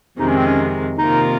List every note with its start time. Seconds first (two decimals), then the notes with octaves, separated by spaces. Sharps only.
0.19 F2 C3 D#3 G#3 D#4
0.28 C#4
0.37 C4
0.46 C#4
0.98 C3 D#3 A#3 D#4 F4 A#4